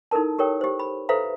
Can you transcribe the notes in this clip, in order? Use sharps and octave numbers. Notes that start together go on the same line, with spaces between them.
D#4 E4 A4 A#4 A5
G4 A4 A#4 C#5 G5
G4 C5
B5
A4 B4 C5 E5 F5 A#5